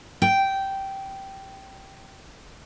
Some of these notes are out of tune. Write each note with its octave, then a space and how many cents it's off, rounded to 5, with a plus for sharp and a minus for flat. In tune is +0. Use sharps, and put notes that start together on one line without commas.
G5 -10